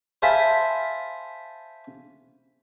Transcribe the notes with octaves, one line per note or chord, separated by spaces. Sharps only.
C5 E5 F5 G#5 A5 B5